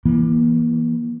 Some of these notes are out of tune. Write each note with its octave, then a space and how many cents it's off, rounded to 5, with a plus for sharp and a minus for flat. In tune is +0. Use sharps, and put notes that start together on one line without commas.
E3 +0 A#3 +35